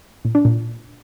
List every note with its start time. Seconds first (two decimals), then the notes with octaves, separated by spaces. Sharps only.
0.25 A#2
0.35 D4
0.45 A#2